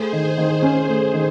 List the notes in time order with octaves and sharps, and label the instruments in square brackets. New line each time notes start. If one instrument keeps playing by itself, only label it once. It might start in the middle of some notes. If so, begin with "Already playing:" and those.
Already playing: [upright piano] A3 [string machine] G#4 C5
[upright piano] D#3
D#3
C#4
A3
D#3